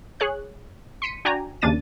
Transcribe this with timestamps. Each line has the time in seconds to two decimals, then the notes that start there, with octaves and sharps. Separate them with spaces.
0.20 G#4 C#5 F#6
1.02 C6 B6 C#7 D#7
1.25 D4 F#4 D5 G5 G#5 A#5
1.62 D#2 C#3 A#3 D4 A6 D#7